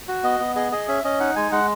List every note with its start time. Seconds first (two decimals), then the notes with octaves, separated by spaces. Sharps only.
0.08 F#4
0.24 B3 D#5
0.40 B3
0.56 G#4 D#5
0.72 G#4 D#5
0.88 C#4 E5
1.04 C#4 D#5
1.20 D#4 F#5
1.36 G#3 G#5
1.52 G#3 F#5